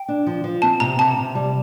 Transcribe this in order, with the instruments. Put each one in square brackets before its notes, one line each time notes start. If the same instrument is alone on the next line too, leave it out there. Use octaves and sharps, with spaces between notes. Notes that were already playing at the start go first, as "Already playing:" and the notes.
Already playing: [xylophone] G5
[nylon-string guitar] D4
F3
F3
[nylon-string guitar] C4 [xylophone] A5
[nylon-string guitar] C3 [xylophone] A#5
[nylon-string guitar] C3 [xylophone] A5
[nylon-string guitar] C3
G3